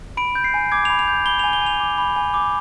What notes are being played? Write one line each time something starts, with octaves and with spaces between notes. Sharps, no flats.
B5 D7
G6
C7
G#5
D6 G#6
B5 F7
F7
G6
B5 G7
G#5 F7
G7
G#5 F7
D6
B5
G#5
D6